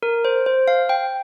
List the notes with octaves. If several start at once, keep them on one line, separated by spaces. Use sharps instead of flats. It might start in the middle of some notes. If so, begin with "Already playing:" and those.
A#4
C5
C5
F5
G5